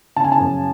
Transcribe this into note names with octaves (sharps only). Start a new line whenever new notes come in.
C#3 A5
G#5
A5
F#2